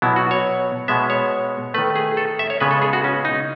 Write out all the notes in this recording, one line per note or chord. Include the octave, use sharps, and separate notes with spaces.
B2 F#3 B3 E4
F#4
C#5
B2 G#3 B3 E5
C#5
D#3 A3 B4
G#4
A4
E5
C#5
C#3 G#3 B3 B4
A4
G#4
F#4
C#4
D#4